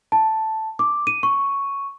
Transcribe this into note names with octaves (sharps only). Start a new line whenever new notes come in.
A5
D6
D#7
C#6